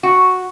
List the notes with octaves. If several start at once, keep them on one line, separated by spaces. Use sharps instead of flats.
F#4